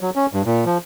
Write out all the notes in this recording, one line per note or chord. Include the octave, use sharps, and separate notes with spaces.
F#3
C#4
G2
A#2
F3